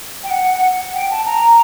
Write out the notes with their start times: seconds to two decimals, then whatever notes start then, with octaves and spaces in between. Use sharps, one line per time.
0.23 G5
0.30 F#5
0.94 G5
1.11 A5
1.26 A#5